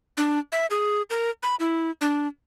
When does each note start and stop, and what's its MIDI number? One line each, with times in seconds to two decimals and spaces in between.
0.17 0.39 62
0.52 0.66 76
0.70 1.02 68
1.10 1.30 70
1.43 1.55 83
1.60 1.91 64
2.01 2.27 62